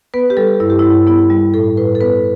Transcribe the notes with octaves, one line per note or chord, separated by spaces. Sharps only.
B3 B4
G4
G3 A4
G2 E4
G4
G2 E4
B3 E4
G3
A2 A4
A2 B4
A4
B3 B4